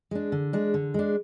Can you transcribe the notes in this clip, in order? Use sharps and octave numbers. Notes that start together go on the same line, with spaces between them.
G#3 D4
D3
G#3 D4
D3
G#3 D4